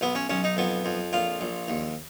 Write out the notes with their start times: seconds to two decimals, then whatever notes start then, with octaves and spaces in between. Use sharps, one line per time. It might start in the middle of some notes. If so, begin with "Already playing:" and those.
0.01 B1 B3
0.15 C#4
0.30 B1 C#4
0.44 D#4
0.57 F2 B3
0.85 F2
1.13 A#1 F4
1.41 A#1
1.68 D#2